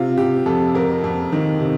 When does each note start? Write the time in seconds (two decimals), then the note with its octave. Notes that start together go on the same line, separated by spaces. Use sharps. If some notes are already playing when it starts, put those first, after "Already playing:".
Already playing: C3 F4
0.17 C3 G4
0.46 F2 A4
0.75 F2 A#4
1.04 F2
1.32 D#3
1.60 C3